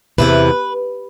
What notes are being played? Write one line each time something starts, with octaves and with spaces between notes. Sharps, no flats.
E2 C3 E3 B4